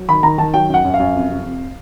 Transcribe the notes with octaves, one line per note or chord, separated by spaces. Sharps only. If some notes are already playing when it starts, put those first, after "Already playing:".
Already playing: F#3
D#3 B5
D#3 A#5
D#3 A5
F#3 G5
F#2 F#5
F#2
F5
F#2
F2
C3
F2